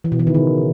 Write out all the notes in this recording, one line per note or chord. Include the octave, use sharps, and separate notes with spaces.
E3
B2
E3
D#3
C#3